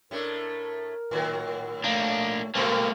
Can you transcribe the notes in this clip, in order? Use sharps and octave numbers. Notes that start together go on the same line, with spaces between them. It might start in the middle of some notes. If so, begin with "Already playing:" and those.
A2 A3 D4 A#4
A2 D#3 F#3
A3 A#3 D4
A#2 A3 A#3 C4 A#4